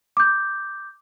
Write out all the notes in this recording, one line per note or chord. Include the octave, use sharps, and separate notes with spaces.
D6 G6